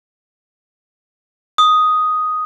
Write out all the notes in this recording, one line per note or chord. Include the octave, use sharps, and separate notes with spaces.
D#6